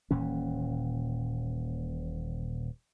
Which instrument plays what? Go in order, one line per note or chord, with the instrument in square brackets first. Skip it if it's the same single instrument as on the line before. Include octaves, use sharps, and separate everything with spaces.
[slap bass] D#1 A#2 E3 C#4